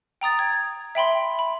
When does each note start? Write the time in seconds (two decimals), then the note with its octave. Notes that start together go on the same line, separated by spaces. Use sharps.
0.21 G5 A#5 D#6 A6
0.39 G#6
0.95 E5 G5 B5 C6
1.39 B5